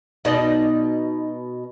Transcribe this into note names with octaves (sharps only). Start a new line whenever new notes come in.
B2 D#4 D5 D#5